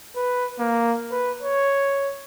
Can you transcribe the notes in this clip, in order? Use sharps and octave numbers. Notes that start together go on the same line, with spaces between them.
B4
A#3
B4
C#5